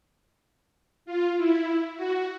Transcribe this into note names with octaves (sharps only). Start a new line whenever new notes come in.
F4
E4
F#4